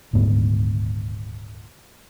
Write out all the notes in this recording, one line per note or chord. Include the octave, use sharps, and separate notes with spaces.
D#1 D2 G#2 B3